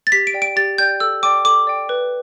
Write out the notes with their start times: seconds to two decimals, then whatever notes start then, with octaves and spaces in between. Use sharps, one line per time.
0.07 A6
0.12 G4 B6
0.27 D7
0.34 D5 G5
0.42 D7
0.56 G4 A6
0.78 D5 G5 G6
1.00 A4 E6
1.23 D5 G5 D6
1.45 A4 D6
1.67 D5 G5
1.89 B4